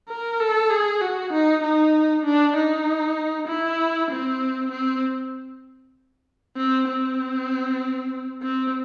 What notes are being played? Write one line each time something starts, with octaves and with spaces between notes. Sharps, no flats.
A#4
A4
G#4
F#4
D#4
D#4
D4
D#4
E4
C4
C4
C4
C4
C4